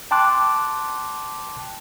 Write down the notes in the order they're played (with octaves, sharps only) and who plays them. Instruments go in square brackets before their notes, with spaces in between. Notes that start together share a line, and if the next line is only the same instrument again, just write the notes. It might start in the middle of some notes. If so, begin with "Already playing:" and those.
[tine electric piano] G5 A5 C6 D6 F#6